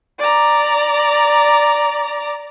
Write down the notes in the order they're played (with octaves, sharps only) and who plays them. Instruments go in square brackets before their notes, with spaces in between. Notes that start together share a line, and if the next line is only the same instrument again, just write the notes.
[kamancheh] D5 A#5